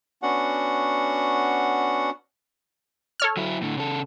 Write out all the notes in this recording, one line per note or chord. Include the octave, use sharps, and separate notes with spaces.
B3 C#4 D4 F#4 F#5
A4 C#5 F6
F#3 E4
A2 D3
C#3 A4